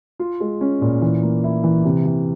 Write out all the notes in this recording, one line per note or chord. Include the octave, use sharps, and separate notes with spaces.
F4
G#3
C#4
A#2
E3
A#3
E4
E3
C3
E3